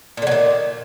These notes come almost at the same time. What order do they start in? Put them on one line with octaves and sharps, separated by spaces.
A#2 D3 F#3 D#3